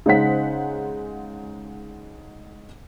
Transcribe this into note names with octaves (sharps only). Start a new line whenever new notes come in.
C#3 G#3 D#4 C5 F#5 B6